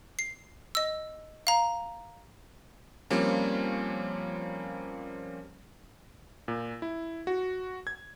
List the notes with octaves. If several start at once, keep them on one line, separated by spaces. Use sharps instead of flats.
C7
D#5 E6
F5 A#5
F3 G3 A#3 C4 C#4
A#2
E4
F#4
G#6